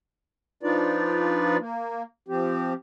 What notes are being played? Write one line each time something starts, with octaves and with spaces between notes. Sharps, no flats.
F3 D4 D#4 F4 B4 D5
A#3
F3 C4 G4